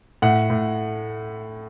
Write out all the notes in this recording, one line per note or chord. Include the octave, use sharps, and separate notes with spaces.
A2 F#5
A2